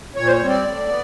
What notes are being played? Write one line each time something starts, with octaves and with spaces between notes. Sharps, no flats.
A#2 C#5
C5
C#5
G3 C4
D5
A2
B3